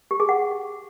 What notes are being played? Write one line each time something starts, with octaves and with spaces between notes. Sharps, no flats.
G4
G#4
F#5